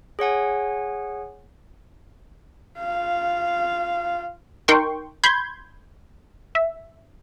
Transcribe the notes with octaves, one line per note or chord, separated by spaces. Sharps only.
G#4 C#5 F#5 G#5
F4 F5
D#4 A#4 G5 C6 C#6
B5 C6 G6 G#6
E5